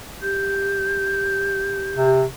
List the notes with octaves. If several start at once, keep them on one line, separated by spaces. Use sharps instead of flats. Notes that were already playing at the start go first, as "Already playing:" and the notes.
G4 G6
C3